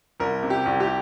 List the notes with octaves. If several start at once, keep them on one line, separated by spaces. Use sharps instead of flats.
C2 A#4
C3
G4
C2
G4